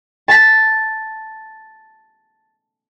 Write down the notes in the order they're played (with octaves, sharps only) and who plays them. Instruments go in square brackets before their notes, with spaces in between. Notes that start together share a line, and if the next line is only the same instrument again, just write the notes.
[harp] A5 B6